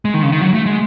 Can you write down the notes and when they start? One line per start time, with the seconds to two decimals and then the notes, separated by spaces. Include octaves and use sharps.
0.05 G#3
0.14 D#3
0.23 C#3
0.32 D#3
0.41 F#3
0.54 A3
0.66 G#3